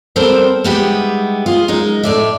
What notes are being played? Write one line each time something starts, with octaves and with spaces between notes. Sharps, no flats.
G3 B3 C4 A4 A#4 C5
G3 G#3 B3 D#4 E4 G4
F4 G#4
F#2 G#3 D#4
A2 D5 E5